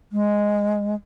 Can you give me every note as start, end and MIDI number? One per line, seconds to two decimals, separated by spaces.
0.12 0.95 56